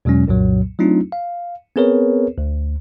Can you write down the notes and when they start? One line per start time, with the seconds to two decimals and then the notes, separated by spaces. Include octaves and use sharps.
0.05 E2 B2 F#3 G#3 C#4
0.27 C2 F#2 A#2 F#3
0.79 F#3 A3 C4 D4 D#4 F4
1.12 F5
1.76 B3 C4 G#4 A#4 B4 C#5
2.38 D2